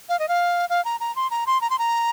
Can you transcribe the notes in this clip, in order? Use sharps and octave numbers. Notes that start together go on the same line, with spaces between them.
F5
D#5
F5
F5
A#5
A#5
C6
A#5
C6
A#5
C6
A#5